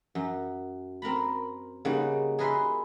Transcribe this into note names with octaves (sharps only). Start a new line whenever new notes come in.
F#2
C4 A#4 A#5 B5
C#3 G3 A#3 D#4 F#4
G#4 A#4 B4 D#5 E5 C6